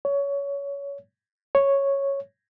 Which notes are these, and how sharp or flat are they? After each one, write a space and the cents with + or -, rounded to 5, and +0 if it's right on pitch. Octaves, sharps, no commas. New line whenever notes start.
C#5 +20
C#5 -5